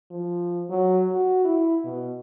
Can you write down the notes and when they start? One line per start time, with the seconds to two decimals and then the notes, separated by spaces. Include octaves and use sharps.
0.11 F3
0.70 F#3
1.12 F#4
1.45 E4
1.85 B2